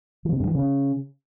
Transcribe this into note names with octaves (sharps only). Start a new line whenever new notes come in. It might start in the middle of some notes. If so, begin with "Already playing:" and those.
E3
C3
G2
E3
C#3